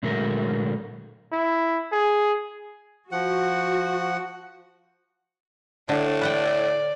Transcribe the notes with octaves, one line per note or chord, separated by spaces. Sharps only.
A#2 D3 F#3 G#3 A3 A#4
E4
G#4
F3 F#4 F#5
A2 D3 D4
B4 D5 F#5 G5